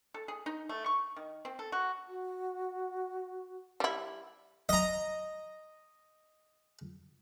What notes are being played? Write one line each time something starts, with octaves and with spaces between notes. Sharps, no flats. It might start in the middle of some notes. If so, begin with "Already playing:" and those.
A4
G#4
D#4
A3
C#6
D#3
C4
A4
F#4
F#4
G3 E4
D#5 A#5